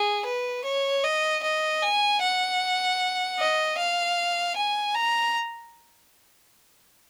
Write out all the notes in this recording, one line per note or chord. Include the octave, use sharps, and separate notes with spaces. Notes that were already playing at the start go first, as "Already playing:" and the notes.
Already playing: G#4
B4
C#5
D#5
D#5
G#5
F#5
D#5
F5
G#5
A#5